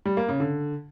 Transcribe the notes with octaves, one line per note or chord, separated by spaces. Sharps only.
G3
A#3
C#3
D3